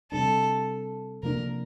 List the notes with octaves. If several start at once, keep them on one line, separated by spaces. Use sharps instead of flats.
C3 G3 D4 A4
C3 F3 A#3 D4 A#4